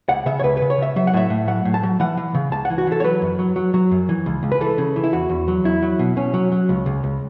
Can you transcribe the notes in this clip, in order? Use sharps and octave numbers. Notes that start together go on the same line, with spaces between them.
C#2 F#5
C#3 E5
C#5
C#2 B4
B4
C#3
C#5
C#3 E5
F#3 E5
F#5
A2 E5
A2
F#3 F#5
A2
A5
F#3
E3 F#5
E3
C#3
C#2 A5
F#5
E3
F#4
E3 A4
C#5
F#3 B4
F#2
F#3
F#3
F#3
F#2
E3
C#2
C#2
B4
E3 A4
C#3
E3
E4
E2 F#4
E2
F#3
E2 E4
F#3
B2
B2 C#4
F#3
F#3
C#2
C#2
C#2